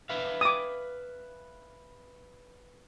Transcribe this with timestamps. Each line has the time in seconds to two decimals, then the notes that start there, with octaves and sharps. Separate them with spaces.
0.09 B4 E5 F5
0.41 D6 D#6